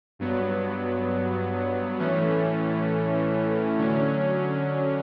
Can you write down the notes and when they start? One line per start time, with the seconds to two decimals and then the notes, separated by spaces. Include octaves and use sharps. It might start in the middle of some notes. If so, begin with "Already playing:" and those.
0.19 G2 F#3 B3
1.98 A2 E3 A3 C#4
3.78 D3 F#3 C#4